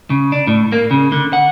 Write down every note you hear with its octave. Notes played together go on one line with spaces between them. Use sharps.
C#3
D4
A2
A#3
C#3
D3
F#5